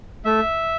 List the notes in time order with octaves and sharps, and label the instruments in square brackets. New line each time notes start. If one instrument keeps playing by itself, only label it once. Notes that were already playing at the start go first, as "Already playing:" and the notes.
[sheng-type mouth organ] A3 E5